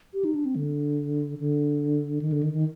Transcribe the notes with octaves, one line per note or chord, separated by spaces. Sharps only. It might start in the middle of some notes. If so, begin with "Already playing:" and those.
G4
D#4
D4
C4
D3
D3
D#3
D3
D#3
D#3